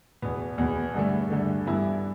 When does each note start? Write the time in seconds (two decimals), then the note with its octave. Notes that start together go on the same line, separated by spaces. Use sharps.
0.22 E2 B2 B3
0.58 E2 B2 B3
0.94 G2 D3 A3
1.30 G2 D3 A3
1.66 G2 E3 B3 E4